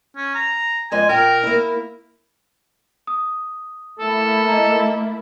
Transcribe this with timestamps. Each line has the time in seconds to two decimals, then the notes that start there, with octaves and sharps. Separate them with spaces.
0.17 C#4
0.35 A#5
0.92 F2 G#3 D#5 G#5
1.09 A#2 A#4 G5
1.43 A#3 E4
3.07 D#6
3.99 A3 A#3 E4 A4
4.48 D#5 A#5